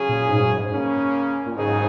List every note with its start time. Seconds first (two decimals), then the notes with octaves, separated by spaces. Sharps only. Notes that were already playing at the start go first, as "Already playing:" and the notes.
Already playing: C#3 F#3 C#4 G#4
0.09 A#2
0.30 G#2
0.44 F#2
0.57 G#2
0.72 C#3 A#3 C#4
1.46 A#2
1.55 D#2 G#2 C#3 F#3 D#4 G#4